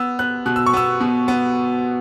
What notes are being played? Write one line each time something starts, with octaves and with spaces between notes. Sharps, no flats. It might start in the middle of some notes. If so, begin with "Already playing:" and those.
Already playing: B3 E6
B3 F#6
B2 F#6
E6
C#6
B3 E6
B2
B3